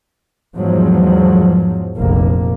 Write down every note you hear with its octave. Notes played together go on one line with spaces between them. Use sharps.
E2 G#2 F3 F#3
F1 A#1 A#3